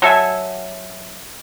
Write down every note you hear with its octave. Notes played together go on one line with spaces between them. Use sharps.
F#3 A4 E5 G#5